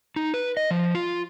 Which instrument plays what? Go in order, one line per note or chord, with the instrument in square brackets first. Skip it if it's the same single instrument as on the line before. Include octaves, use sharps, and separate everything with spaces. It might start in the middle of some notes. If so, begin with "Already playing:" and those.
[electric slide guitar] D#4
B4
D#5
F3
F4